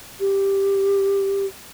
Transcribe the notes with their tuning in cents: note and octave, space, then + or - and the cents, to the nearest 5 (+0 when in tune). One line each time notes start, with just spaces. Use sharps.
G4 +5